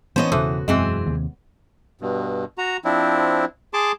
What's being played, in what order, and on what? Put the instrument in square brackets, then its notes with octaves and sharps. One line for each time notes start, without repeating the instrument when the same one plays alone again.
[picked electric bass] E3 [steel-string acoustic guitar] B3 C#4 D#5 [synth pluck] C5 [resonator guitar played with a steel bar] A5
[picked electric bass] E1 C#3 [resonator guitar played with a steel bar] E3 [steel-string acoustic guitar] F#4 [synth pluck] A4 C5 D#6
[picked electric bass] E1 F#2 [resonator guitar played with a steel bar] E3 C4 G#4 [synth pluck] G#3
[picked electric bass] D#2 C3
[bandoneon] G2 B2
F#4 A#5
F3 C4 D4 E4
G#4 A5 C6 D6